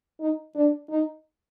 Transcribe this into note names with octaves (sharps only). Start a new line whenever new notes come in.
D#4
D4
D#4